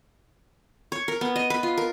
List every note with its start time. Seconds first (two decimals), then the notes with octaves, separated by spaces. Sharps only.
0.92 C#5
1.08 A#4
1.21 B3
1.36 D#5
1.50 B4
1.63 F4
1.78 A#4